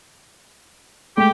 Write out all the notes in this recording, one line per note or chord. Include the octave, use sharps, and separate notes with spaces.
G#3 A3 G4